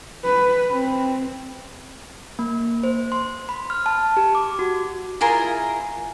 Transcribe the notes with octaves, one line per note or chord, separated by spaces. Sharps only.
B4
C4
A#3
C5
C6
B5
F6
A5
G4
D6
F#4
E4 F4 G#4 A#4